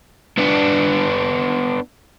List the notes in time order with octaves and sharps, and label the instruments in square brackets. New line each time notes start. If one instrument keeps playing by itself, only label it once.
[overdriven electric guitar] B3 D4